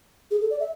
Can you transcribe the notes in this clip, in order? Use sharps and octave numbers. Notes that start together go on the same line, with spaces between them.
G#4
A4
D5
E5